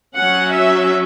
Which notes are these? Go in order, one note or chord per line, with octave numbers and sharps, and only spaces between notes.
F#3 C#4 F#5
E5